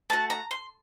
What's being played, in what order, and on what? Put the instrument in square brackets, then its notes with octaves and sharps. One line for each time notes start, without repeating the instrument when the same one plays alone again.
[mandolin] A3 D4 F#4 A5
A#5
C6